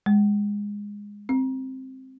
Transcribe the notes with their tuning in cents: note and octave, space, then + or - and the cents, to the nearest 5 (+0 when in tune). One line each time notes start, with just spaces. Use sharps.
G#3 -15
C4 +5